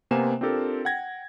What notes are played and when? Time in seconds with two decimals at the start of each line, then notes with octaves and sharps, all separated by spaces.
0.11 C3 A#3 B3 C5 G#5 E7
0.41 C4 D4 F4 G4 A4 A#4
0.85 F#5 G5 G#6 A#6